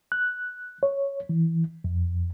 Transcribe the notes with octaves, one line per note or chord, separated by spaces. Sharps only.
F#6
C#5
E3
F2